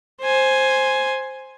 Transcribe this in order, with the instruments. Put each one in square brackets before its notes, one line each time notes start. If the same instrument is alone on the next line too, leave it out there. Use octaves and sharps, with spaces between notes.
[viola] C5 G#5